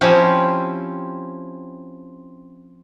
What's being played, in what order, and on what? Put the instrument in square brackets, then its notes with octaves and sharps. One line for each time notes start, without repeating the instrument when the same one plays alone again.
[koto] F3 C4 C#4 E4 G4